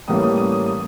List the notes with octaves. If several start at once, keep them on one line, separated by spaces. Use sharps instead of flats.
A2 E3 G3 A#3 C#4 D#6
D#6
D#6
D#6
D#6